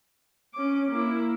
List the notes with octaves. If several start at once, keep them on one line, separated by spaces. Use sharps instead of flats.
C#4 D6
A#3 E4